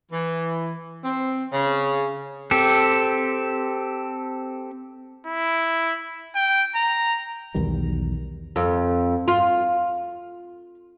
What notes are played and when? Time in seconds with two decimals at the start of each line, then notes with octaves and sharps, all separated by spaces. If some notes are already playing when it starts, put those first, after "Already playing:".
0.12 E3
1.03 C4
1.53 C#3
2.51 C4 G4 A4
5.26 E4
6.35 G5
6.75 A#5
7.54 B1 E2 D#3 G3
8.56 F2
9.28 F4